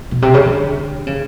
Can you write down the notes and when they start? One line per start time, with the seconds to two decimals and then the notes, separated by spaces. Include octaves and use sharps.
0.11 B2
0.22 C3
0.34 C#3
0.46 D3
1.07 C#3